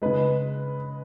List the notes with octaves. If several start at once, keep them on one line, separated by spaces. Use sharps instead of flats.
C#3 G#3 B4